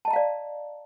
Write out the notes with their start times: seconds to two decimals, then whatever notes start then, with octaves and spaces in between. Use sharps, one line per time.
0.05 A5
0.08 D#5
0.11 A#5
0.13 F5
0.16 D5